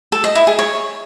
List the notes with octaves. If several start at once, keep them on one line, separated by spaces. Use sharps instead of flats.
A4
D#5
E4
G#4
C#5